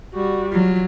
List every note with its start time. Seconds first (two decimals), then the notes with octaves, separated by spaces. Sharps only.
0.14 G3 F#4
0.52 F#3 F4